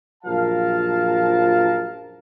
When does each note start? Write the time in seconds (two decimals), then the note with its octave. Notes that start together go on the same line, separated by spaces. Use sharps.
0.24 A#1 F#2 F3 A#4 F5 A5